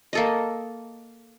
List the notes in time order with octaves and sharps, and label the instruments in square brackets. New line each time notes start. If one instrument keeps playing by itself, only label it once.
[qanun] A#3 A4 D#5